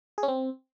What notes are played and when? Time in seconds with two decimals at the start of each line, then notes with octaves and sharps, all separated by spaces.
0.18 G#4
0.23 C#4
0.28 C4